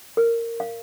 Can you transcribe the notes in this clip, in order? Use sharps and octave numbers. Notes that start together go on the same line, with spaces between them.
A#4
F5